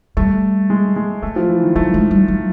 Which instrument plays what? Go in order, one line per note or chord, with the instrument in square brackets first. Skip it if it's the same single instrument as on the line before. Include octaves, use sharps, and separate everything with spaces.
[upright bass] G3 [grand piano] A3
[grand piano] G#3
G#3
[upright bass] F#3 [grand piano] A3
[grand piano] F3
E3
D#3
[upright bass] F#3 [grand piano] A3
[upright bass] G#3
G3
F#3